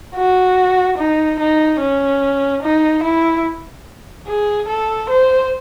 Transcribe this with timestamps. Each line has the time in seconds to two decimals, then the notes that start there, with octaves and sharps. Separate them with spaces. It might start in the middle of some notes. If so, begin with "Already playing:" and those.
0.16 F#4
0.98 D#4
1.40 D#4
1.80 C#4
2.63 D#4
3.03 E4
4.27 G#4
4.68 A4
5.09 C5